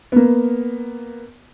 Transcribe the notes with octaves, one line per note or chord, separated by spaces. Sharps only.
A#3 B3